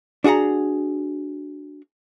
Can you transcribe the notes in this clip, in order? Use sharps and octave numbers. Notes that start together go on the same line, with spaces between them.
D4 F#4 G#4 F#5 A#5